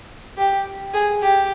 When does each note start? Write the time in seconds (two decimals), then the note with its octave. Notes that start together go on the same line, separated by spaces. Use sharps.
0.38 G4
0.93 G#4
1.22 G4